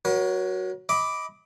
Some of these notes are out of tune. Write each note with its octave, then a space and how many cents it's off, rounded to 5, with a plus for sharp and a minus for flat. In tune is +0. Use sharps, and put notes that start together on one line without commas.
F#3 +0 A#4 +40
D#5 +25 B5 +5 D6 +0